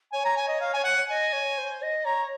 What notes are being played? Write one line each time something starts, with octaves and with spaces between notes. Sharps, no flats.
C#5 G#5
A#5
G#5
D#5
F5
G#5
F#5
D#5 G#5
C#5
C5
D#5
C#5 A#5